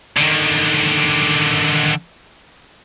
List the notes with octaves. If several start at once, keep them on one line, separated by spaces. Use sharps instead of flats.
D3 D#3